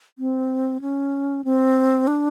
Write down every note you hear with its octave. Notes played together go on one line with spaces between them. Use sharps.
C4
C#4
C4
D4